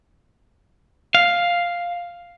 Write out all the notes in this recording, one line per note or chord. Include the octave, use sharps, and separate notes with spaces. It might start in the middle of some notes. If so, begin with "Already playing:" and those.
F5